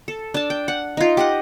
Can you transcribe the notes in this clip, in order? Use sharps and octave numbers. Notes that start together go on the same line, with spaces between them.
A4
D4 A5
G5
F#5
D#4 F4
G4 D#5 F#5